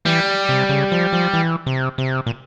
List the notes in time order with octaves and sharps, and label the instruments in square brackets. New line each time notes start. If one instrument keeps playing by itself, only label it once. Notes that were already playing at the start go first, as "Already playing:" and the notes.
[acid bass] E3 [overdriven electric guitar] G3
[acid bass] C3
C#3
F3
F3
E3
C3
C3
A#2